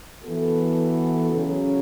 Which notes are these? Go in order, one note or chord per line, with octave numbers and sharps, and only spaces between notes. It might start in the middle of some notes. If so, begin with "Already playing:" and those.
E3 B3 F#4 A4
C#3 F#3 C#4